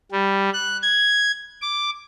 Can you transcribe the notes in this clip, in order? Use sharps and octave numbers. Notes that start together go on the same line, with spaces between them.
G3
F#6
G#6
D6